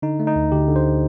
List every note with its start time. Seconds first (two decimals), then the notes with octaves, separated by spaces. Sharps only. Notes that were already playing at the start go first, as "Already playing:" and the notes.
0.02 D3 D#4
0.20 A3
0.27 D#4
0.36 D2
0.52 D2 G4
0.68 D3
0.76 C5